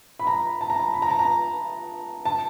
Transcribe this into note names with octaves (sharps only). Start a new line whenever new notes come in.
B5
A#5
A5
A#5
A5
B5
A#5
A5
A#5
A5